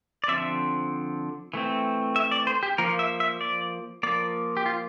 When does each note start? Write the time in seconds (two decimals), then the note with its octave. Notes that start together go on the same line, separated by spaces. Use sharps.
0.24 D5
0.28 D3 F3 C4 E5
1.54 E3 A3 C4
2.16 E5
2.31 D5
2.47 C5
2.63 G4
2.78 F3 A#3 A#4
2.99 E5
3.20 E5
3.41 D5
4.03 F3 A#3 D5
4.57 G4
4.66 F4